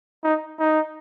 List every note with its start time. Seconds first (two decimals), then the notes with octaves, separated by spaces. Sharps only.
0.24 D#4
0.59 D#4